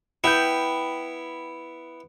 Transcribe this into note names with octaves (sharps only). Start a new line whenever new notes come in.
B3 E4 G5 G6